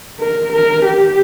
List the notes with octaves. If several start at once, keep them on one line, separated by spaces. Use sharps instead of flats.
A#4
A#4
G4